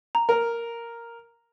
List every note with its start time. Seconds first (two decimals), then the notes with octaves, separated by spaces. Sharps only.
0.15 A#5
0.29 A#4